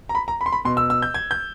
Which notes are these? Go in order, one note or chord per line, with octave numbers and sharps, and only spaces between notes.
A#5
B5
A#5
B5
C6
B5
B2 C6
E6
E6
G6
G#6
G6